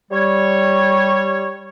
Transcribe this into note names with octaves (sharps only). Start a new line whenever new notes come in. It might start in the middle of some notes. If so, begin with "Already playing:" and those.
G3 C#5